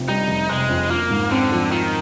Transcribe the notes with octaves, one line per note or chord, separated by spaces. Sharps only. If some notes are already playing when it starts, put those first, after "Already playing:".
Already playing: F1 F2 C3
G3 D#4
F1
C3 G#3
F2
A#3 F4
G#2
D3 C4
F3
D#3 F4